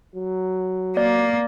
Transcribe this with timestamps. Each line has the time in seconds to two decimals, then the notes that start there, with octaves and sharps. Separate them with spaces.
0.15 F#3
0.97 A#3 D5